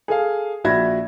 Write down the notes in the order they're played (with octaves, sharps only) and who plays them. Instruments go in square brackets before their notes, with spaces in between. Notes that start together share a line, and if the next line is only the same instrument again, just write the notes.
[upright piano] G#4 A4 F5
A#1 F#4 E5 B5 G#6 A#6